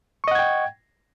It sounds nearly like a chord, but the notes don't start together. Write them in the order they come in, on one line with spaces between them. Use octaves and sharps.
C#6 D#5 F#5 G#6 G5